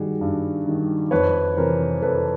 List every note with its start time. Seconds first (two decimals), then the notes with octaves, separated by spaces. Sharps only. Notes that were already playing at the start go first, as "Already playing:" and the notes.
Already playing: G2 D#3 G3 F#4 G#4
0.21 G2
0.66 D#3 G3
1.11 F2 B4 C#5
1.57 C3 E3 A#4 C5
2.02 F2 A4 B4